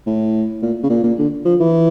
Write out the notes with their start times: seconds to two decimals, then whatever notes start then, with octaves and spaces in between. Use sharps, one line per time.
0.07 A2
0.62 A#2
0.83 C#3
0.89 A#2
1.03 A#2
1.18 D3
1.45 F3
1.60 E3